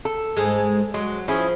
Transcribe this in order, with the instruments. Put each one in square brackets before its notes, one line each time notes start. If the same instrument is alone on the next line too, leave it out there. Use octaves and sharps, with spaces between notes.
[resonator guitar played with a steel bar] A4
[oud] G#2 G#3
[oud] F#3 [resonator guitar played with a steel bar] G#3
[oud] F3 [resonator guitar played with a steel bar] C#4 E4 G#4